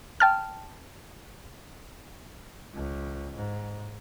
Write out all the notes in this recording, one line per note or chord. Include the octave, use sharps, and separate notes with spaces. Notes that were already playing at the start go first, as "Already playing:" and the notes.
G5 A5 F6
C#2
G#2